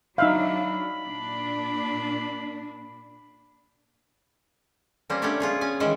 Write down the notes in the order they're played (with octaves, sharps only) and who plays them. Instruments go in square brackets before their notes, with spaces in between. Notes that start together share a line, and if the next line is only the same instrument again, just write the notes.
[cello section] F#3 D4 [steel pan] D#4 E5 F5 [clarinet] B5
[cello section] A#2 D4
[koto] G3 A#3 C4 C#4
A3 B3 C#4 D4 G4 C#5
F4 G#4 C#5
C#4 G#5
D#3 E3 G#3 C#4 C5 F#5